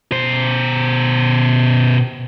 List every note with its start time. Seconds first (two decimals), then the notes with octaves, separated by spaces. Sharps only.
0.12 B2 C5